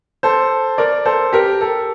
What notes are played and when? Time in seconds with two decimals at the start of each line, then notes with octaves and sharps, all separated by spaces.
0.23 A4 C5
0.78 A#4 D5
1.05 A4 C5
1.33 G4 A#4
1.61 A4